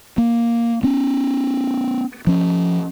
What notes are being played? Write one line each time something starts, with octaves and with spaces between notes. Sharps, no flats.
A#3
B3 C#4
F3 C#4